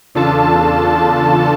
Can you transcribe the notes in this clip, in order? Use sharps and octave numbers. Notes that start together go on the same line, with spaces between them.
E2 C#3 D4 F4 A4 A5